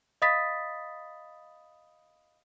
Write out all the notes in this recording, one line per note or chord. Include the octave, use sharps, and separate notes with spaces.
D#5 F5 B5 D#6 A6 B6